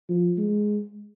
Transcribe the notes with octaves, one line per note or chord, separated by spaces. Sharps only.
F3
G#3